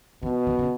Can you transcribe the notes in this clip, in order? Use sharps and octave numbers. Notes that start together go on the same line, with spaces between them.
B2 D#3
D#3
C#3